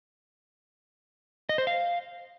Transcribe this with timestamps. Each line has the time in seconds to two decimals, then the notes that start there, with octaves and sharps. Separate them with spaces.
1.49 D#5
1.58 C5
1.67 F5